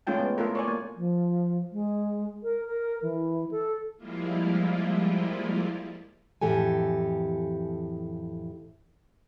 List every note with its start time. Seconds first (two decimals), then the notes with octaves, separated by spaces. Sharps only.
0.07 G#3 A3 C#4 F4 G5 A5
0.19 B3
0.38 A3 F4 A4 A#4
0.55 C#5 D5 G#5
0.68 A#3
0.96 F3
1.72 G#3
2.43 A#4
2.66 A#4
3.02 E3
3.51 A4
3.97 F3 G3 G#3 A#3 E4 F4
6.41 F2 A2 E3 G4 A4 G#5